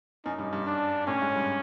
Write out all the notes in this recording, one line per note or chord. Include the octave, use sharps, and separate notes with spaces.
F#2 D#4
G2
G2
D4
A2 C#4
G#2
G2